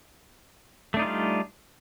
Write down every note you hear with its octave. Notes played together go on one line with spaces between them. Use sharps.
G3 A3 D4 D#4 F4